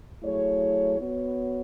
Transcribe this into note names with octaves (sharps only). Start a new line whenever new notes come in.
F#3 A3 E4 G#4 C#5
B3 F#4 C#5